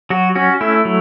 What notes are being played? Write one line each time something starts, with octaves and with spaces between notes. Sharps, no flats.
F#3 F#4
C#4 F#4
A3 E4
F#3